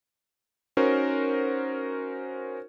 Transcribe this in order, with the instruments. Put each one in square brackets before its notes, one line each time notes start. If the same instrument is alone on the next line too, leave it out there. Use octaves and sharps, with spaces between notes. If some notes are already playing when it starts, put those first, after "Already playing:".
[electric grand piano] C#4 D#4 F#4 A#4 C5